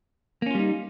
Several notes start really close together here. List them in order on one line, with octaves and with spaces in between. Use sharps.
A#3 C#4 F4 G3 D#4